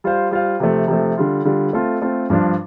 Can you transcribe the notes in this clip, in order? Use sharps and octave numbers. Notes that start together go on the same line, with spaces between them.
G3 F4 C5 F5
G3 F4 C5 F5
C3 F3 A3
C3 F3 A3
D3 G3 F4
D3 G3 F4
A3 C4 F4 A4
A3 C4 F4 A4
G2 F3 D4 F4